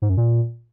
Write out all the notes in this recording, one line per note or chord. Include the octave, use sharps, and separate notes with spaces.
G#2
F#2
A#2